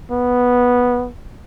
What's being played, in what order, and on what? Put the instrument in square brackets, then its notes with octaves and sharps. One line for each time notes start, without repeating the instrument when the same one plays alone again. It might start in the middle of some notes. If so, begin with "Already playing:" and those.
[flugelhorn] B3